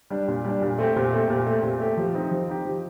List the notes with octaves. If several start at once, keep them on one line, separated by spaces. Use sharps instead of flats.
G3 D4
A#2
G3 D4
A#2
A3 C4 G4
A#2
A3 C4 G4
A#2
A3 C4 G4
A#2
A3 C4 G4
F3
C4 D#4 G4
F3
C4 D#4 G4
F3